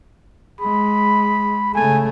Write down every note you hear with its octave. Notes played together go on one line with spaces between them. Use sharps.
G#3 B5
C#3 A3 G#5